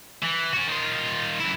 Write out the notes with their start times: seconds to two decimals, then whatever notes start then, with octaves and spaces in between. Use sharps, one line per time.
0.23 E3
0.53 C#4 F#4
0.67 D#3 F4
1.40 F#2 E4